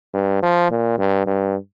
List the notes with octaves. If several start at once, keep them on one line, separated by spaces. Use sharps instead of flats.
G2
F3
A#2
G2
G2